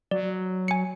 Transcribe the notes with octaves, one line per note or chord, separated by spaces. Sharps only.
F#3 D5
G#5 C#7